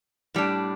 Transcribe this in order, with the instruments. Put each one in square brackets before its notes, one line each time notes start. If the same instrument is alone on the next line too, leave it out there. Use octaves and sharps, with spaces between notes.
[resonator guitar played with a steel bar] A2 G3 D4